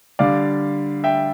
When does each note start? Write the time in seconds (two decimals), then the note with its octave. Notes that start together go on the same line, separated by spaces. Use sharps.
0.19 D3 G3 D5 F5
1.04 E5 G5